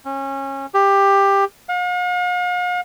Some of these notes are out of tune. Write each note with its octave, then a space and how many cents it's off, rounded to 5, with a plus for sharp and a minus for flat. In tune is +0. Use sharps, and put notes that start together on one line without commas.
C#4 -25
G4 +15
F5 +45